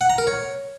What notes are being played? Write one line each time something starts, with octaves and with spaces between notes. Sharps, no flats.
F#5
A#5
A#4
C#5